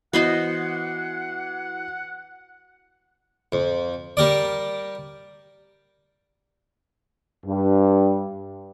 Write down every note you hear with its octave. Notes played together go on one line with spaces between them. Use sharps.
E3 B3 F#4 C5 D#5 F#5 C7
F2
G3 G4 A#4 D5
G2